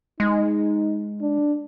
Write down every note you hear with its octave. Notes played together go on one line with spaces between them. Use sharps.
G#3 D#4
D4